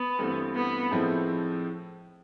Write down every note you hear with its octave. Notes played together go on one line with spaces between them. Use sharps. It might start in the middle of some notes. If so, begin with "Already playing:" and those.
Already playing: B3
G2 E3 A3 C4
B3
A2 F3 G#3 C4 E4